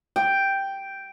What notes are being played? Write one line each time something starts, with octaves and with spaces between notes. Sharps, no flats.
G5